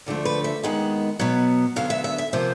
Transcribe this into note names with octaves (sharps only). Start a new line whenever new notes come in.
D2 D3 F3 A3
B4
E5
D#2 D#3 G#3 B3 F#5
B2 F#3 B3
D2 D3 F#3 B3 F5
E5
E5
E5
C3 F3 A#3 C5